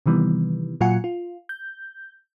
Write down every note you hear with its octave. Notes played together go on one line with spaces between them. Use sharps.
C3 D#3 E3 G3 B3
A#2 F#3 F4 F#5 G#5 C#7
F4
G6